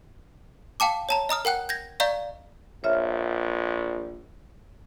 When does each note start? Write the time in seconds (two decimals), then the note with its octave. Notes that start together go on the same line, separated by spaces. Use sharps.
0.80 F5 G5 A5 D6
1.09 C#5 A5 A#5
1.29 D#5 A#5 D#6 F6
1.45 A#4 F#5 G5 F#6
1.69 G6 G#6 A#6
2.00 D5 D#5 F5 A#5 C#6 G6
2.84 A#1 C#5 E5 F6